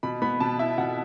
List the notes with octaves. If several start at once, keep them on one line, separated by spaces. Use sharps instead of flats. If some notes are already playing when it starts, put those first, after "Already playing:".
B2 B5
B3 B5
B2 A5
E4 E5
B2 F#5